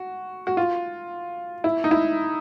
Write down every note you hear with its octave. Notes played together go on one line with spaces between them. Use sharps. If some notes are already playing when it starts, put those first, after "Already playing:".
Already playing: F#4
F#4
F4
E4
D#4
E4